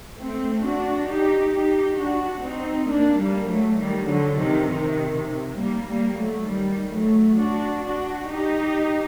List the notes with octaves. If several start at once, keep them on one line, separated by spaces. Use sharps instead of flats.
A3 C4
D4 F#4
D#4 G4
D#4 G4
D4 F#4
C4 D#4
A#3 D4
G3 A#3
F#3 A3
D#3 G3
D3 F#3
C3 D#3
C3 D#3
C3
G3 A#3
G3 A#3
F#3 A3
D#3 G3
F#3 A3
D4 F#4
D4 F#4
D#4 G4